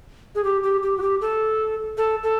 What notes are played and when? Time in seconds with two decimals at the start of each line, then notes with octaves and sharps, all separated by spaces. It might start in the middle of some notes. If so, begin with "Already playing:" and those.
0.35 G#4
0.44 G4
0.63 G4
0.83 G4
0.98 F#4
1.02 G4
1.21 A4
1.97 A4
2.23 A4